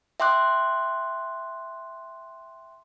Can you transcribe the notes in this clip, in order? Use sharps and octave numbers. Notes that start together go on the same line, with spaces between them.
E5 G5 C6 D6 F#6